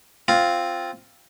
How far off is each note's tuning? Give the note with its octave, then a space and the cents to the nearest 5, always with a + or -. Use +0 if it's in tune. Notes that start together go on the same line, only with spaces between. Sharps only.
C4 +0 F4 +0